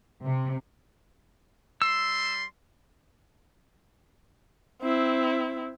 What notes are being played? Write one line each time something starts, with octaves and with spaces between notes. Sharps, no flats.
C3
G3 C6 E6
C4 E4